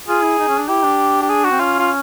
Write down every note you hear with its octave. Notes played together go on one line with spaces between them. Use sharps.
F4 G#4
E4
D#4
C#4
D4
E4 G4
D4
G4
G#4
F#4
C4
C#4 F4
F4